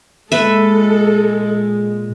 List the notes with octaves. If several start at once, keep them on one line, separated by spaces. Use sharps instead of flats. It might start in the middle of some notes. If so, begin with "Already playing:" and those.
A#2 G#3 A4 B4 E5